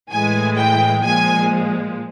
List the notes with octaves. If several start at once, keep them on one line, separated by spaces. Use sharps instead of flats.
A2 E3 G#3 G#5
G5
A#2 F3 G#3 G#5